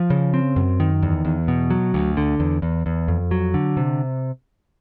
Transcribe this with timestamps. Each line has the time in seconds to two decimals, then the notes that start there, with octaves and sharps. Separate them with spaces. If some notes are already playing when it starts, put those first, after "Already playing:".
Already playing: F3
0.10 C#3
0.34 C4
0.56 F#2
0.80 D#3
1.02 E2
1.25 E2
1.48 B2
1.70 F#3
1.94 D2
2.17 D3
2.40 E2
2.62 E2
2.86 E2
3.08 F2
3.31 F#3
3.54 D3
3.77 C3